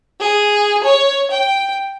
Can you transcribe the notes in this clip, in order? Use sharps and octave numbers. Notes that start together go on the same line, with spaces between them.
G#4
C#5
G5